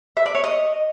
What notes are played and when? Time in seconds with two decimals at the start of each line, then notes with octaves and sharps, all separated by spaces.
0.17 E5
0.26 D5
0.35 C#5
0.44 D#5